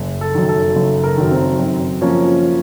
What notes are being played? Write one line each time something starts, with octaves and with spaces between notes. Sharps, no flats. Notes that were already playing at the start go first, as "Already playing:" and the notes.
Already playing: F#1
A4
F#2 D#3
A4
F#1 A4
A#4
F#2 D#3
C4 C5
F#2
F3 A#3 C#4